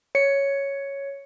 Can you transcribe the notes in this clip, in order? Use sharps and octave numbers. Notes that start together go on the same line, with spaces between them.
C#5 C#7